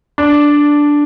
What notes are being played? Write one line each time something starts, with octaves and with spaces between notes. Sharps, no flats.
D4